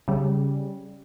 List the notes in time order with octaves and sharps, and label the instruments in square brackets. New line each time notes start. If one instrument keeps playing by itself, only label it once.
[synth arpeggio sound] C#3 G3